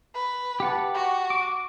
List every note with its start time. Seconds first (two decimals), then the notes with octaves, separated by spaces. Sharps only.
0.14 B4
0.60 G4 F#5 A5
0.95 F#4
1.30 D6